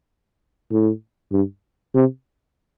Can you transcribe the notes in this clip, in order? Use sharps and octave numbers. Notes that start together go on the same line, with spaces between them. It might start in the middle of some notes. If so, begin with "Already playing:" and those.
A2
G2
C3